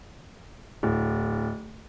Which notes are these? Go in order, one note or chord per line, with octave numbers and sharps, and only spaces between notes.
D1